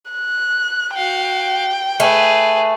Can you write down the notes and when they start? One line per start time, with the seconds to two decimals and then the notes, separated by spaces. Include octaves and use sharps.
0.11 F#6
0.95 F#4 F5 G5
2.00 A3 G#4 B4